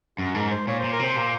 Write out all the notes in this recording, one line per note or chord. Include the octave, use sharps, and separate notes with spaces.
F#2 F#4
G#2 A#4
C5
A#2 C#5
A#2 C5
A#4
C3 C5
A#2